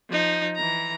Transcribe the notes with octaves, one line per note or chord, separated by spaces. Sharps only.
F3 D#4
E3 A#5